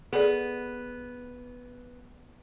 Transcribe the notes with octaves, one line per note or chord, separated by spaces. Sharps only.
B3 G#4 A4 D5